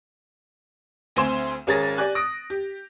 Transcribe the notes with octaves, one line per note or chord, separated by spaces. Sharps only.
D2 C4 G#5 C6 E7
G#1 C#4 G#4 A#4 A6 A#6
G4 D5 G#5 F#6
D#6 A#6 D7
G4